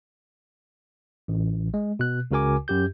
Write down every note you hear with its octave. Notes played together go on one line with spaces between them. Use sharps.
A1
G#3
B2 F#6
C#2 C#3 F#4 A#4 G#5 D6
F#2 G4 G6